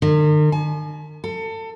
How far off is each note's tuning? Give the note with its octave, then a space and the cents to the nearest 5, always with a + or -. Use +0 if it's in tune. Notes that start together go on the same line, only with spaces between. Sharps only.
D#3 -45
G#5 +45
A4 +30